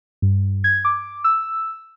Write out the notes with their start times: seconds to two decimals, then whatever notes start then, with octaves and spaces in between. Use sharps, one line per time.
0.22 G2
0.64 G#6
0.85 D6
1.24 E6